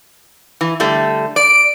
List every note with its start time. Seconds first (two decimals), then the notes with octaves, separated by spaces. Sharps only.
0.61 E3
0.80 D3 G3 A3
1.36 D5 D7